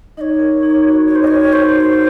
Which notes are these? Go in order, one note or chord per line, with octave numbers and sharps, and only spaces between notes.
D#4 C#5 D#5
A#4
D#4
F#4
D#4 C#5
C5
D#5
A#4 C#5
D#4 C5
F#4